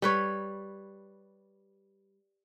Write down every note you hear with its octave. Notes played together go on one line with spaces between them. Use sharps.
G3 B4 C#5